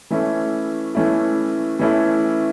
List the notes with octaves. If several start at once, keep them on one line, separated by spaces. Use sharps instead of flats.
E3 A3 C#4 E4
E3 A3 C#4 E4
E3 A3 C#4 E4